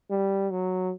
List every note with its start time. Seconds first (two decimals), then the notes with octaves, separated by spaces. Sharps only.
0.10 G3
0.50 F#3